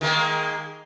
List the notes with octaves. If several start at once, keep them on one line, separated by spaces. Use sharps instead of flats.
D#3 G#3 A#3